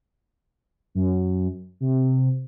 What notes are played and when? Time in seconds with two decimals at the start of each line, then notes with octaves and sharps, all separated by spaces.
0.95 F#2
1.81 C3